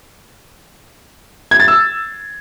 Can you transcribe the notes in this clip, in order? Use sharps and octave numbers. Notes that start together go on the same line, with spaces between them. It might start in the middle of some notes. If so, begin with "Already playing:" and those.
G#6
A6
E6